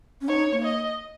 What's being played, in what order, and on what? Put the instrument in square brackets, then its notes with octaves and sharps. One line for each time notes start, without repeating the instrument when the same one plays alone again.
[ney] C#4
[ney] D#4 [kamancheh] C#5
[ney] A#3
[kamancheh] D#5